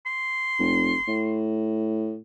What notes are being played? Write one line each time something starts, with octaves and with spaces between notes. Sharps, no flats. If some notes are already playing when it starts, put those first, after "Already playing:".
C6
F1
A2